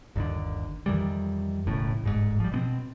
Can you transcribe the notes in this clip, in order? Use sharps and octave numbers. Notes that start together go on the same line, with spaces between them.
G1 D#2 D3
F2 D#3 E3 G3
E1 A1 A2 C#3
D1 G1 G#2
F3 G3
B2 B3 C4